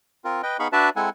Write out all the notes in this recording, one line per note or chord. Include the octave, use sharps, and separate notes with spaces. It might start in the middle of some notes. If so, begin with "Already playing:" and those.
C4 F4 A#4
B4 D#5 G5
B3 D#4 G#4 F5 B5 C#6
D4 F#4 B4 D5 E5 A5
G#3 C4 E4 A4 F#5 G#5